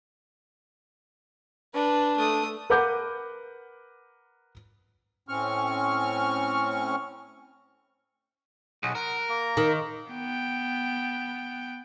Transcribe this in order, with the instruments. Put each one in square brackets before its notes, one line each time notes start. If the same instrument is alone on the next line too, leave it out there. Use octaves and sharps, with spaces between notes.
[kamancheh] D4 [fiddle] B4
[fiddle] A3 D#6
[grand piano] A#4 B4 F#5 D6 G6
[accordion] A2 C4 C#4 C#6 F6
[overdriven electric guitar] B1 [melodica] G#4 F#5
[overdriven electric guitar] A#4 [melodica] F#5
[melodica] A#3
[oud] D#3
[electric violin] B3 G5